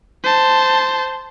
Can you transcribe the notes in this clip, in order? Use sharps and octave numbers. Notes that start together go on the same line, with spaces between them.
C5 A5